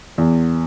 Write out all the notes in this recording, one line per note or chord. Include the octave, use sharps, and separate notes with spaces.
E2